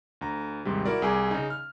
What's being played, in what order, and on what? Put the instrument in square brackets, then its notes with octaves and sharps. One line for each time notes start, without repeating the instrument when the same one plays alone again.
[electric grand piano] D2 A#5
D#2 G#2 C3 G3
E4 F#4 A#4 D5
C2 G#4 G#5 A#5 D6
C#3 D#4
F6